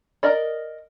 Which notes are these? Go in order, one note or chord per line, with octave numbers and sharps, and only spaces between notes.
A#4 D5 D#5